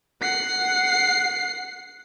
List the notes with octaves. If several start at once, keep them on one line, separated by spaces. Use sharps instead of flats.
F#5 C7